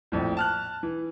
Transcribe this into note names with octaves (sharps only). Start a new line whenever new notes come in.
A#1 F2 A2
A5 F6 F#6
E3